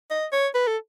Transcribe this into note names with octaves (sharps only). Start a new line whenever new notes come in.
D#5
C#5
B4
A4